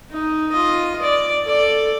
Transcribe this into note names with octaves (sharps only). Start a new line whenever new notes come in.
D#4
F4 D#5
D5
A4 D5